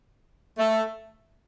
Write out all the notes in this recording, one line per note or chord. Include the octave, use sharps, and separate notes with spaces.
A3